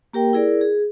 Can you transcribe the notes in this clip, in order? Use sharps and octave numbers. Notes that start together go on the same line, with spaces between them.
A#3 G4 A#4 G5
E4 G#4 A#4 D5
G#4